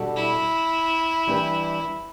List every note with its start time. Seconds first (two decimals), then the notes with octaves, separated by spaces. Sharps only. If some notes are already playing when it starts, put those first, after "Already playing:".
Already playing: B2 G3 D4 F#4 A4
0.16 E4
1.27 E3 G3 D4 G4 B4